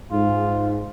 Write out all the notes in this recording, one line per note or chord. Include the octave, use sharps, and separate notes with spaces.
G#2 F4